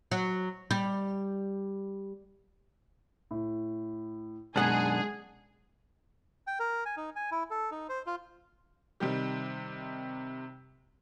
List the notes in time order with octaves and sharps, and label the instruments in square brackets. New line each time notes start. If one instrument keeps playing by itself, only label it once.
[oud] F#3
G3
[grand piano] A2
[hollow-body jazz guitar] F#2 B2 D#3 [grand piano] G#3 [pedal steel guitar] D4 F#5 [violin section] G#4
[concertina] G5
A#4
G#5
D#4
G#5
E4
A4
D#4
C5
F4
[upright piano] C3 D#3 G3 G4